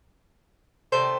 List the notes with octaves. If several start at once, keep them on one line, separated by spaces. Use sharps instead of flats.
C3 D#3 A3 A4 C5